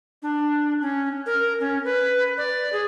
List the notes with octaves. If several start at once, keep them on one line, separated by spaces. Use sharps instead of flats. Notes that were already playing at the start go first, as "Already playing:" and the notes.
D4
C#4
A#4
C#4
B4
D5
G#4